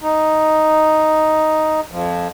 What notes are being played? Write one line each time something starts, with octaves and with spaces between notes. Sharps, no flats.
D#4
F2 F3